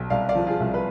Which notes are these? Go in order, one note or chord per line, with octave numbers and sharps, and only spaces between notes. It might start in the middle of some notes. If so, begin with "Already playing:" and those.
Already playing: B1
C2 D5 F5
D5 F5
F3
F4 G#4
C2
B4